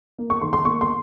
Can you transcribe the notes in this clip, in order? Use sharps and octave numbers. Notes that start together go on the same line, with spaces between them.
A#3
C#6
D#3 C6
C6
A#3 C#6
C6